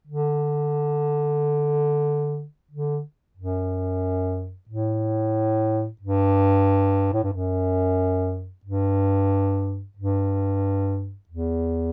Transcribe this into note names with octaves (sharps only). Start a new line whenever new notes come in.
D3
D3
F#2
A2
G2
A2
G2
F#2
G2
G2
E2